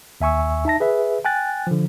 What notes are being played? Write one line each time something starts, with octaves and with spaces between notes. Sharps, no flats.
D#2 E5 G#5 C#6 E6
D#4 E5 A5 A#6
G#4 B4 E5
G5 G#5 F#6 A6
D3 F3